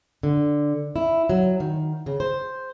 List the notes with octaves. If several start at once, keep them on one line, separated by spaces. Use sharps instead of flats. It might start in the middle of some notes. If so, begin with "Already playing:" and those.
D3
E4
F#3
D#3
C#3
C5